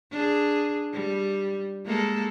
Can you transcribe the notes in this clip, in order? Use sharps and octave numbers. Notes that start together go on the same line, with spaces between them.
D4 G#4
G3
G#3 A#3 A4